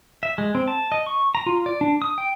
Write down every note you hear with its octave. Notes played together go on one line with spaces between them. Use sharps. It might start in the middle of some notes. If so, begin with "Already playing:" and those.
E5
G#3
C4
A5
D#5
C#6
A#5
F4
D5
D4
D#6
G5